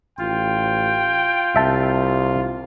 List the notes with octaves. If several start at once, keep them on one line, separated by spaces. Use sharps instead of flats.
A1 F4 G5
C2 E5 A5